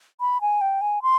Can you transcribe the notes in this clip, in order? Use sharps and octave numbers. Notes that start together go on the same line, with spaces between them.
B5
G#5
G5
G#5
C6